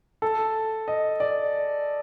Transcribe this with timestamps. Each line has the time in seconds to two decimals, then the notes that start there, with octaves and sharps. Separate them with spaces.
0.22 A4
0.88 D#5
1.20 D5